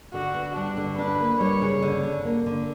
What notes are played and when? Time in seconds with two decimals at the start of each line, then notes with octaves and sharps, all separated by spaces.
0.13 D3 F#4
0.34 B3
0.56 G3 D4
0.77 D3
0.98 D4 B4
1.20 A#3
1.40 G3 C#5
1.62 C#3
1.82 D3
2.03 D4
2.25 A#3
2.46 D3